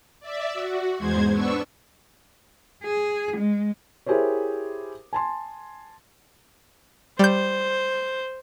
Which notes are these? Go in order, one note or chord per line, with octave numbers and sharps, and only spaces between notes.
D5 E5
F#4
E2 G#2 G#3 C5 G#6
B3 D4 C#6 E6
G#4
G#3
E4 G4 G#4 A#4 C5 C#5
G#5 A5 C6
G3 C5 G6